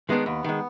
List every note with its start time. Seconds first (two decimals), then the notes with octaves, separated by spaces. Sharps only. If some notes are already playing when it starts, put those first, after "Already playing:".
0.09 D#3 G#3 B3 D4
0.26 D#2 B3
0.44 D#3 G#3